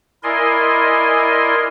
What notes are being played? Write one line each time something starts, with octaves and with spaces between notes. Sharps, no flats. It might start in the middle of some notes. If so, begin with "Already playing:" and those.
E4 A#4 D5 D#5 G#5 C6